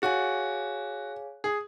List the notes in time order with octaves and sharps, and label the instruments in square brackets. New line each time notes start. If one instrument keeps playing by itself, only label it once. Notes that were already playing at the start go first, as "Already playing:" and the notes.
[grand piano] F#4 [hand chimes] G#4 C#5 F5 G#5
[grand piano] G#4